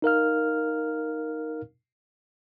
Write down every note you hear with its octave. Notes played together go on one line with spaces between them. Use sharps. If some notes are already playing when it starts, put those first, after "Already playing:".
D#4 A#4 F5 F6